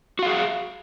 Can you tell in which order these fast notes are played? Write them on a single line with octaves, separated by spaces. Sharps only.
F#4 F5 G#4